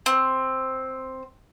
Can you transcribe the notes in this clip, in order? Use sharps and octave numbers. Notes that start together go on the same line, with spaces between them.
C4